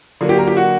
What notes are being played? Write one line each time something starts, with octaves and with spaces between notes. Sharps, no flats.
D3 F#3 A#3
G4 G5
A#4 A#5
G4 G5
F#4 F#5